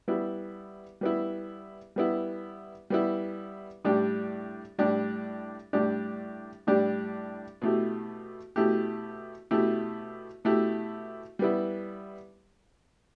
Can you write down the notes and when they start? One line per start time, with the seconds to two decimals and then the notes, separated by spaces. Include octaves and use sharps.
0.08 G3 B3 E4
1.01 G3 B3 E4
1.96 G3 B3 E4
2.90 G3 B3 E4
3.85 A2 G3 D4 G4
4.78 A2 G3 D4 G4
5.73 A2 G3 D4 G4
6.67 A2 G3 D4 G4
7.62 B2 A3 E4 G4
8.56 B2 A3 E4 G4
9.51 B2 A3 E4 G4
10.45 B2 A3 E4 G4
11.39 G3 B3 E4